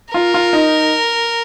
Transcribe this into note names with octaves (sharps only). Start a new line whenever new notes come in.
F4 A#4
F4
D#4